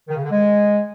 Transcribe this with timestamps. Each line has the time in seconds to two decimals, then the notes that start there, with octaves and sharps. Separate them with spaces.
0.08 D#3
0.16 C#3
0.23 D3
0.31 G#3